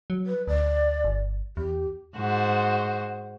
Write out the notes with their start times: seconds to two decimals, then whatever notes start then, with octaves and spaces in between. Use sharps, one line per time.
0.10 F#3
0.26 B4
0.47 D2 D5
1.04 G1
1.57 E2 G4
2.16 G#2 F#4 C5